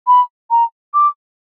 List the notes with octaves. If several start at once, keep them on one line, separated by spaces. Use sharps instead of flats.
B5
A#5
D6